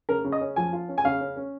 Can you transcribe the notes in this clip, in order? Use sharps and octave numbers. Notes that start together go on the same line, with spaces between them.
C#3 A#4
C#3
D#5
C#4
F3 G#5
F4
C#4
G#5
C#3 F5
C#4
C#4